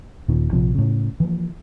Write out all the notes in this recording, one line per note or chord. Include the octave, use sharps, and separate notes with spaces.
D#1 A#2 D#3
A#1 C3 F3
A2 C#3
E3 F3 A#3